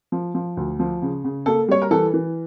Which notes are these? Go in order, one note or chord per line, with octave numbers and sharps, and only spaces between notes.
F3
F3
D2
F3
C#3
C#3
A#3 A4
G3 C#5
A#4
E3 A4
E3